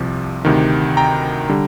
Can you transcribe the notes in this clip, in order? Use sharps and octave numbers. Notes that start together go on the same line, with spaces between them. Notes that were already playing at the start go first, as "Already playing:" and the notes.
Already playing: C2 C3 F3
D2 C3 D#3
G5 A#5
D3 G3